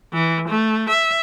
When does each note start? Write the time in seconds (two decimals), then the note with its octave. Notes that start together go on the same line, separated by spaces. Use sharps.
0.13 E3
0.49 A3
0.90 E5